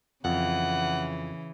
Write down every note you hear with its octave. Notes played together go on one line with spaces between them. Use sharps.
F2 C#3 E3 F#5